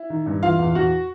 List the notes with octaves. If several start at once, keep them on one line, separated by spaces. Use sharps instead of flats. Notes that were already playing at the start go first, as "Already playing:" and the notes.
Already playing: E4
D#3
G2
E3 F4 F5
E2
E2 F#4 F#5